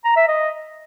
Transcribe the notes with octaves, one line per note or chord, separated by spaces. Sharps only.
A#5
E5
D#5